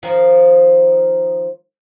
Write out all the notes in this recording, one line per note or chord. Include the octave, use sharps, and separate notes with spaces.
D#3 F3